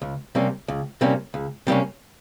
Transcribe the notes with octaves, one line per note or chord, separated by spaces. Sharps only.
C#2
C3 G3 A#3 C#4
C#2
C3 G3 A#3 C#4
C#2
C3 G3 A#3 C#4